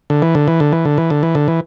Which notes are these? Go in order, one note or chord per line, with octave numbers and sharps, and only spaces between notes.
D3
E3
D3
E3
D3
E3
D3
E3
D3
E3
D3
E3